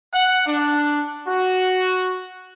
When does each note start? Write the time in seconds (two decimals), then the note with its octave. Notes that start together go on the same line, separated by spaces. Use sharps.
0.14 F#5
0.47 D4
1.28 F#4